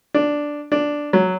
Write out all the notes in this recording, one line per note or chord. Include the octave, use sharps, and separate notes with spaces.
D4
D4
F#3